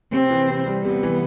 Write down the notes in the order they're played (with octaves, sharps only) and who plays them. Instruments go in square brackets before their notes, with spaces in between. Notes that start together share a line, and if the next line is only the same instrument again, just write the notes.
[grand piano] C3 [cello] C4
[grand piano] E3
C3
G3
[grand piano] C3 [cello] B3
[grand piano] E3